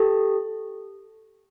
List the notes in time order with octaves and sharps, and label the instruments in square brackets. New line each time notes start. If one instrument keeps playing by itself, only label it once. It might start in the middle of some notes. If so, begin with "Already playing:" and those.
Already playing: [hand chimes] G4 A4